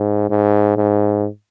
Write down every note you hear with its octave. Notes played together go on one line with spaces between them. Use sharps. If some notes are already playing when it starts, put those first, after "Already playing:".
Already playing: G#2
G#2
G#2